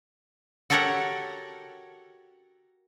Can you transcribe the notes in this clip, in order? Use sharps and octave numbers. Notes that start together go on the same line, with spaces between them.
F#4 G4 A4 A#4 C#5 F#5